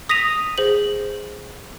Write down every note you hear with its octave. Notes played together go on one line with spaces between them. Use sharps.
D#6 A#6 B6 D#7 F7
G#4 C5 F#7